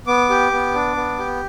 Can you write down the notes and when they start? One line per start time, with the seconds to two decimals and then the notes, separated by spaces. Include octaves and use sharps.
0.07 B3 D6
0.30 G4
0.52 B3
0.74 D4
0.96 B3
1.19 G4